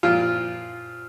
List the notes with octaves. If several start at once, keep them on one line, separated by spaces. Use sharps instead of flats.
A#2 F3 F4